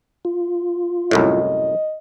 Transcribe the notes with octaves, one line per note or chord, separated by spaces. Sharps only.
F4
C2 F#2 A2 D#5